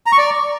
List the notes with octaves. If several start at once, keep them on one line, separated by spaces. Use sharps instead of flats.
A#5
C#6
D5